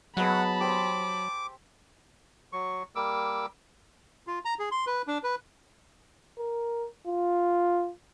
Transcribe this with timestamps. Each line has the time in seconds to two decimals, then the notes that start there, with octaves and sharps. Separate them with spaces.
0.17 F#3 G#3 B3 F#5 A5 B5
0.61 G4 C5 D6 E6
2.53 F#3 C#6
2.96 G3 A#3 D6 E6
4.27 F4
4.45 A#5
4.59 G#4
4.72 C6
4.87 B4
5.07 D4
5.23 B4
6.38 A#4
7.07 F4